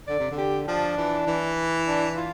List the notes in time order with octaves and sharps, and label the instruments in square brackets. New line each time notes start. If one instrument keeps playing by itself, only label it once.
[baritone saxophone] D3 [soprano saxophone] D5
[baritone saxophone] C3
D3
[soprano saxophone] G4
[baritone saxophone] F3 [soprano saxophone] D4
[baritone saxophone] E3
E3
[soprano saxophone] D4
F4